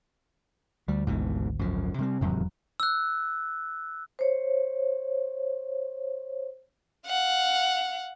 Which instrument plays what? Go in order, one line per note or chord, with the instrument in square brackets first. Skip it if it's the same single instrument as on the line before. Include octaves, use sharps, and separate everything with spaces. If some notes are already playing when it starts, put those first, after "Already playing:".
[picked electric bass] D2 [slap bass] G3
[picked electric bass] G#1 D2 [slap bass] G#2 B2 E3
[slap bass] F#2 F3
C3 G3 C4
[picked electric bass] F1 E2 F#3 [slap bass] G#2 C3 D#3
[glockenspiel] E6 F#6
[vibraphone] C5 C#5
[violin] F5 F#5